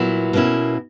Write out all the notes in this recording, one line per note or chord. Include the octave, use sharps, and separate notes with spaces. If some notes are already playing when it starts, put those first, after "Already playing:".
Already playing: A#2 F#3 B3 E4
B2 A#3 C#4 E4